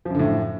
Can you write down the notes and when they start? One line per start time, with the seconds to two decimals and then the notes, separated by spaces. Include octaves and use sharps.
0.05 F3
0.10 F#2
0.15 D3
0.19 A2